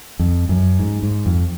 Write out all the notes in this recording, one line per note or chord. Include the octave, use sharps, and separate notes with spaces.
F2
F#2
G#2
G#2
F2